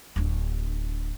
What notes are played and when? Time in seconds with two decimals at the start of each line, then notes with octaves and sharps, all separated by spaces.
0.16 D1 D4